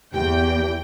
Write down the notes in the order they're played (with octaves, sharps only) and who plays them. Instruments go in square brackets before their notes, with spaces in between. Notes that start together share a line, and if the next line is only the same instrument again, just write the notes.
[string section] E2 [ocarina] G4 [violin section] G5